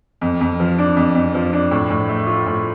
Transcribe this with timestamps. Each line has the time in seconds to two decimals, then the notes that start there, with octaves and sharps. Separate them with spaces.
0.21 F2
0.41 F2
0.60 F3
0.78 D4
0.97 F2
1.15 F2
1.35 F3
1.53 D4
1.71 A2
1.90 A2
2.09 A3
2.27 F4
2.46 A2